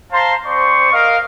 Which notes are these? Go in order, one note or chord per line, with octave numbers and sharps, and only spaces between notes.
C5 F5 A5 A#5 C6
C4 C5 D5 C#6
A#4 D#5 F5